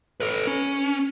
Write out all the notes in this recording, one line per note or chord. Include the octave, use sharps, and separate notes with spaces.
A4 B4
C#4